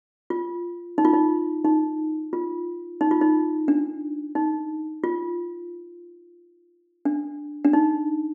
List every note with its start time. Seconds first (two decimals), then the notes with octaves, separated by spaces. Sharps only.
0.30 F4
0.98 D#4
1.05 F4
1.13 D#4
1.65 D#4
2.33 F4
3.01 D#4
3.11 F4
3.21 D#4
3.68 D4
4.35 D#4
5.04 F4
7.05 D4
7.64 D4
7.73 D#4